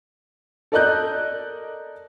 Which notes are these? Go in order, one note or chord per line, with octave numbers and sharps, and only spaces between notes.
A4 A#4 D5 D#5 F#6 G6